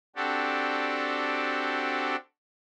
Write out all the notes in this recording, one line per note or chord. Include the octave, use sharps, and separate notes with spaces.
C4 D4 F#4 G4 A4